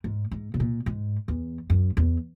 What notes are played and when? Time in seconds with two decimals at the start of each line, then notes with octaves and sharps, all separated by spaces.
0.04 G#2
0.31 G#2
0.54 B2
0.60 A#2
0.86 G#2
1.28 E2
1.70 F#2
1.97 E2